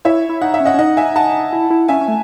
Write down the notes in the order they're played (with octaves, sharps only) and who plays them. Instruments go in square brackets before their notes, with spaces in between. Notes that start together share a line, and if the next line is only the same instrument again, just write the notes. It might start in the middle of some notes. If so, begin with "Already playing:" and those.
[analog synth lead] E4 [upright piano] C#5 E5
[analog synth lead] E4
[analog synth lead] D#4 [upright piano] F#5
[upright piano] E5
[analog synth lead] C#4
[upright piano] D#5 F#5
[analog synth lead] C#4
[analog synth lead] D#4 [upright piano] D#5 F#5
[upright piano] E5 G#5
F#5 A5
[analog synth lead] E4
E4
[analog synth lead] C#4 [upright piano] E5 G#5
[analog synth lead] C#4
A3